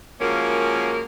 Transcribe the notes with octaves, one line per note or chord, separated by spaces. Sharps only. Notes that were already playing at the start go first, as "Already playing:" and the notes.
F3 G#3 A#3 C#4 F#4 A#4